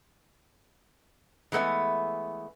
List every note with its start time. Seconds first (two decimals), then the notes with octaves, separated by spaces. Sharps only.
1.52 E3 G#3 A3 B3 G#5